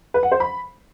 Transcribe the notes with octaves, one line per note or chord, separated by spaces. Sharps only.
B4
F#5
C5
B5